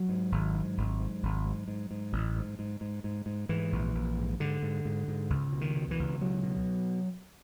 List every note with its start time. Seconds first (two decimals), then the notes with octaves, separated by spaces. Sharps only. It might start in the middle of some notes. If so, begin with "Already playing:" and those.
Already playing: F#3
0.09 G#2
0.32 G#1
0.55 G#2
0.77 G#1
1.00 G#2
1.23 G#1
1.45 G#2
1.68 G#2
1.91 G#2
2.12 A1
2.36 G#2
2.59 G#2
2.81 G#2
3.04 G#2
3.26 G#2
3.49 G#2 E3
3.72 A#1
3.95 A#1
4.17 G#2
4.40 G#2 D3
4.63 G#2
4.85 G#2
5.08 G#2
5.30 C#2
5.53 B2
5.61 D#3
5.76 B2
5.91 E3
5.99 C#2
6.21 B2 F#3
6.44 B2